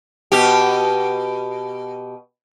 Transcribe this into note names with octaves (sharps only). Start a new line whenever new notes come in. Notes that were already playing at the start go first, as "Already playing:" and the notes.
B2 G4